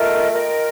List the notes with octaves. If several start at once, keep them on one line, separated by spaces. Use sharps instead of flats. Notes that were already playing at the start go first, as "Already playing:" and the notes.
Already playing: A3 F4 A#4 D#5 G5
F4 A#4 D#5 G5